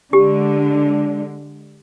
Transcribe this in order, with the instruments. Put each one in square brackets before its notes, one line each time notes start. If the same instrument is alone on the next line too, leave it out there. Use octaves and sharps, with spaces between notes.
[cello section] D3 G#3 [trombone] D4 [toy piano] G4